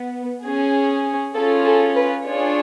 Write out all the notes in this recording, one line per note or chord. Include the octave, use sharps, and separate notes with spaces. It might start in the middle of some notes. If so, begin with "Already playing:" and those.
Already playing: B3
C#4 G#4
C#4 F4 G#4 A4
A4
B4
D4 F4 G#4 C#5